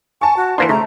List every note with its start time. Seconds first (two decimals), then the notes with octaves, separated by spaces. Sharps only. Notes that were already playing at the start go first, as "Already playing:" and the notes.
0.21 G#5 A5 C#6
0.37 F#4
0.58 E3 A#3 D4 C5 C6
0.69 C#3 A3 A#5